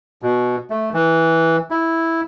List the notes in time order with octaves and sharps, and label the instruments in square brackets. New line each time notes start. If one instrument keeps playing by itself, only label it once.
[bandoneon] B2
A3
E3
E4